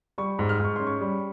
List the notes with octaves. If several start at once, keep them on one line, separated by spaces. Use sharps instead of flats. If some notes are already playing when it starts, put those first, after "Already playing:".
G3 C#6
G#2
F6
G#2 C#6
C#4 C6
C#6
G3